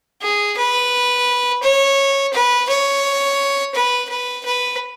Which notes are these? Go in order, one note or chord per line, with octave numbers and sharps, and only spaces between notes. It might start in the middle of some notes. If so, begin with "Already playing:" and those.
G#4
B4
C#5
B4
C#5
B4
B4
B4